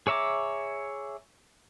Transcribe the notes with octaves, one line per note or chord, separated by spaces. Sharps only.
G#4 C#5 E5 A#5 D6